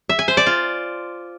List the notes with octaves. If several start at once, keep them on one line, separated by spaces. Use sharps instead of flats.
E5
G#5
C5
D5
F4